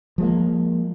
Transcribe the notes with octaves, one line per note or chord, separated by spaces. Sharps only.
F3 G#3 A#3